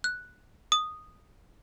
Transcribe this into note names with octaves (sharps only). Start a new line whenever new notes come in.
F#6
D#6